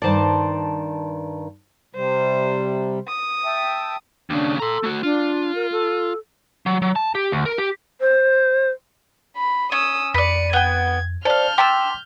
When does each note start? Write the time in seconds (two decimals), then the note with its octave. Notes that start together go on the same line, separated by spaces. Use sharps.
0.02 G2 D#3 C5 D5 A5
1.95 C3 G3 C5
3.07 D#6
3.45 E5 G5 A5
4.30 D#2 C#3 D4
4.60 A4 A#5 C6
4.83 A3 F#4
5.03 D4 F4
5.55 A#4
5.72 A4
6.66 F#3
6.82 F#3
6.96 A5
7.15 G4
7.32 D2
7.45 A#4
7.58 G4
8.01 C5
9.37 B5
9.72 C#4 D#6 E6
10.14 F2 B4 D5 C#7 D#7
10.53 B3 G5 G#6
11.25 A4 C5 D5 F5 F6 G6
11.58 G5 A5 C6 D6 E6 B6